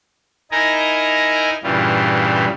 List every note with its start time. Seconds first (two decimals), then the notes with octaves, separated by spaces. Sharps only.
0.51 D#4 E4 A#4 D#5 G#5 A#5
1.63 G2 A#2 C#3 E3 G3 F4